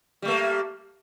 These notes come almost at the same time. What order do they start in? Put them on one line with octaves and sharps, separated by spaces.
G3 A3 A#3